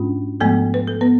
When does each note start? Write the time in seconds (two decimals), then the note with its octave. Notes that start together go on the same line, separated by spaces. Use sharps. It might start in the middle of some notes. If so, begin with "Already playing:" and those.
Already playing: G#2 G#3 C#4 D4 F4
0.40 G#2 F3 G#3 A3 B3 A4
0.74 B4
0.88 A4
1.01 B3 B4